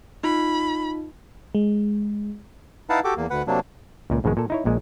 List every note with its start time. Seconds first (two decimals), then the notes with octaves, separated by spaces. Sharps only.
0.24 D#4 F4 B5
1.55 G#3
2.90 D#4 E4 B4 F5 F#5 A5
3.04 F#4 G4 A4 D6
3.17 E2 A#3
3.30 D2 B4 F#5
3.47 C3 F#3 A#3 D4
4.10 C#2 A#2
4.24 A#1 G#2 B2 D#3 G#3
4.37 A#2 A4
4.50 D#4 E4 C#5
4.65 A#1 A#2 G#3